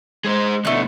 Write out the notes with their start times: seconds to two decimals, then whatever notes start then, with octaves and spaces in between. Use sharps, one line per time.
0.24 G#3 G#4 C5
0.65 D2 B2 A3 D4 D#5 F#6